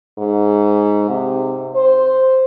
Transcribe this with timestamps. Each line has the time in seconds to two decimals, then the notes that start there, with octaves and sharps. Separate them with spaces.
0.18 G#2
1.09 C3
1.75 C5